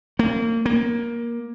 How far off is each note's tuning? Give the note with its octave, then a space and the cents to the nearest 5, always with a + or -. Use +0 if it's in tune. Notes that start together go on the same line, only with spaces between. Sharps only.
A#3 -30
A#3 +15